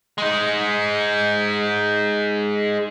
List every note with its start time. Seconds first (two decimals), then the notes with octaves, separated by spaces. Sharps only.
0.18 G#3 D#4